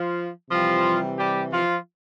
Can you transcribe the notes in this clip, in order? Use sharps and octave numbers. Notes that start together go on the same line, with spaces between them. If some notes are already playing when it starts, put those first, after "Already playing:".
Already playing: F3 F4
C3 E3 F3 G3 F4
G3 G4
F3 F4